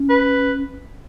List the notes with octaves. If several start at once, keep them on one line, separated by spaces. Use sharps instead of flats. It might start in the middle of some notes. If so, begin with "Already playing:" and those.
Already playing: C#4
B4